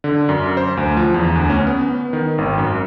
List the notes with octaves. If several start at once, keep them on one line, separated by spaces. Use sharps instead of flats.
D3
F#2
C5
D2
F3
E2
D2
C#4
B3
D#3
G#1
F#2